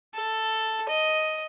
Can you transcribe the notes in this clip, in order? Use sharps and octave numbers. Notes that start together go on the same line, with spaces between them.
A4
D#5